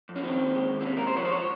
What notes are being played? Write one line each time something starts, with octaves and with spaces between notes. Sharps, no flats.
F2
C#4
D#3 C4
D#2
G#3
D#2
C4
C3 C#4
A#4
C2
C5
F3 C#5
C5
C#5